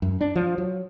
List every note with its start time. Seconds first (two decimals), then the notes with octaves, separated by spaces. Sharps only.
0.02 F#2
0.21 D4
0.36 F3
0.58 F#3